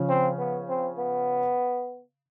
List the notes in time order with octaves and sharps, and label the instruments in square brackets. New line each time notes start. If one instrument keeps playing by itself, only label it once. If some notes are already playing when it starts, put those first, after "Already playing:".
Already playing: [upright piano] C#3 F3 C#4
[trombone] C4
B3
C4
B3